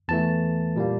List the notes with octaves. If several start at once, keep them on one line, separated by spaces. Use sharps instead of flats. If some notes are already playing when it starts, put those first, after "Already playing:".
E2 E3 A3 A5
A#2 G3 A#3